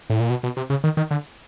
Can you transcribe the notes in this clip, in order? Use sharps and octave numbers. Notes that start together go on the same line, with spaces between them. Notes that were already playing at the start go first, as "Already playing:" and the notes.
A2
A#2
B2
B2
C3
C#3
D#3
D#3
D3